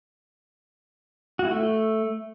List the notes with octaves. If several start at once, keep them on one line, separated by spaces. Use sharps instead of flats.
F#4
E4
A3